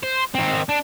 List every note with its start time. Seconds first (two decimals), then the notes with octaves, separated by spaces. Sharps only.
0.03 C5
0.35 D#3 C4
0.69 D4